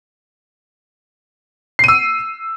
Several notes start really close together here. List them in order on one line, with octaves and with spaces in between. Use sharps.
C7 D#7 E6